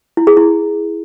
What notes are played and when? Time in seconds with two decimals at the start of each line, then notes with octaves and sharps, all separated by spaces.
0.17 E4
0.27 G#4
0.37 E4